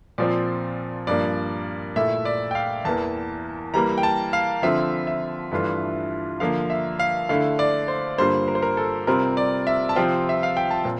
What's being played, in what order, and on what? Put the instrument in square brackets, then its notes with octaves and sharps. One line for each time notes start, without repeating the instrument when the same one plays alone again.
[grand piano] A#2 F3 C4 D5
G2 F3 A#3 D5
A#2 A3 E4 E5
D5
G5
F5
E2 E3 A#3 A5
E3 G3 A#3 A#5
G5
A5
F5
D3 F3 C4 F4 E5
E5
G2 E3 A3 D4 F4
D3 F3 A#3 F5
E5
F5
D3 A3 E4 F5
D5
C5
G2 D3 G3 A#3 F4 C5
A#4
C5
A#4
A4
C3 G3 C4 F4 A#4
D5
E5
A5
C3 F3 C4 F4 G5
E5
F5
G5
A5
A#2 C4